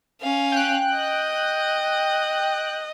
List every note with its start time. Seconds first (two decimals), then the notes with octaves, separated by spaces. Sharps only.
0.21 C#4 F5
0.52 G5 F#6
0.95 D#5